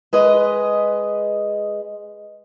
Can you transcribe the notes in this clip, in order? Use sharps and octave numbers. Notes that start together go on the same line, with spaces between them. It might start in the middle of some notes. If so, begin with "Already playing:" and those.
G#3 B4 D#5